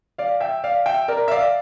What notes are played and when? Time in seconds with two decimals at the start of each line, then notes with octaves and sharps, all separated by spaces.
0.18 D5 F5
0.41 E5 G5
0.64 D5 F5
0.86 E5 G5
1.08 A#4 D5
1.28 E5
1.32 D5 F5